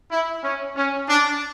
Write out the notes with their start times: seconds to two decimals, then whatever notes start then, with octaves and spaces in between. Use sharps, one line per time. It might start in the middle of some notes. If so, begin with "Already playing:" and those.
0.11 E4
0.44 C#4
0.76 C#4
1.08 D4